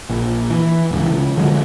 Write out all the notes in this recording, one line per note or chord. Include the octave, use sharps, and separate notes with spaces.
A#1
E3
D1 C#2 E3
C#2
D3 F3 F#3 G#3